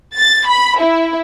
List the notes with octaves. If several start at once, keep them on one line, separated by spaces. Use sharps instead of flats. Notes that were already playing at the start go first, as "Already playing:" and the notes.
A6
B5
E4